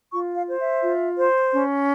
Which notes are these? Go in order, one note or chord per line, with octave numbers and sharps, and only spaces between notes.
F4 C#6
F5
C5
E5
F4
C5
C#4